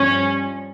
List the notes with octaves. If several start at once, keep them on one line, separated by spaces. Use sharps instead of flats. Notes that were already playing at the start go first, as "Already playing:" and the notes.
Already playing: G2 F3 C#4